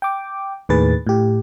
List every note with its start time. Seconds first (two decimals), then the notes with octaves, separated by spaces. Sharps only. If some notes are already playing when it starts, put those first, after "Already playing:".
0.02 G5 D6
0.69 D#2 A2 D#3 G#4 B4 A6
1.07 A2 G4